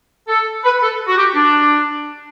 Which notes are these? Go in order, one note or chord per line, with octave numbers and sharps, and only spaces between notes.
A4
B4
A4
F#4
G4
D4